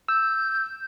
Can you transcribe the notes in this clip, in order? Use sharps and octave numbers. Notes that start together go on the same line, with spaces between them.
E6 G6